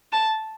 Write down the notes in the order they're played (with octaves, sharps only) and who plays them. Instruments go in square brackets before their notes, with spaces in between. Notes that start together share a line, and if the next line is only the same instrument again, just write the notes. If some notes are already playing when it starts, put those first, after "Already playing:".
[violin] A5